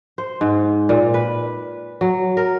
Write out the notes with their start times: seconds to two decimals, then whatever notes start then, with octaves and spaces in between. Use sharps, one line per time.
0.18 C5
0.41 G#2
0.89 A#2
1.14 B4
2.01 F#3
2.37 A#4